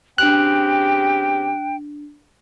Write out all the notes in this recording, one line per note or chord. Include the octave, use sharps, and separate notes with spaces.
C#3 C4 D4 G4 G5 F#6 D7 F7